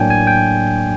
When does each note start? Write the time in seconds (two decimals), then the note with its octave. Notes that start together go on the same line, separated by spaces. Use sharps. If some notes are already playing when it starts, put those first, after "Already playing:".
Already playing: A2 F#3 A#3 D4 G5 G#5
0.10 G#5
0.27 G5